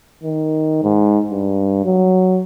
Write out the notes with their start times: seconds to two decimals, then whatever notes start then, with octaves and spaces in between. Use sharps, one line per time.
0.24 D#3
0.83 G#2
1.31 G2
1.85 F#3